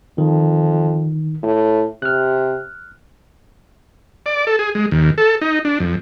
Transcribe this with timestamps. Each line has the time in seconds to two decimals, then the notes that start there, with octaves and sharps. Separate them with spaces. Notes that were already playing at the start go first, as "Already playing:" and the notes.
0.18 F2 D#3
1.43 A2
2.02 C3 F6 F#6
4.26 D5
4.47 A4
4.59 G#4
4.75 G#3
4.91 D#2
5.18 A4
5.41 D#4
5.65 D4
5.80 F2